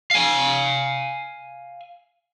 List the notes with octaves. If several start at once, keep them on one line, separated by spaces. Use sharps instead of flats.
F5 G#5